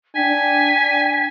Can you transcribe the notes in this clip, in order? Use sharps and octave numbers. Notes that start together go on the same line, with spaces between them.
D4 G5 G#5 B6